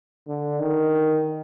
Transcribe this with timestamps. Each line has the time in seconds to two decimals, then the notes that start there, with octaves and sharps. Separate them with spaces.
0.28 D3
0.60 D#3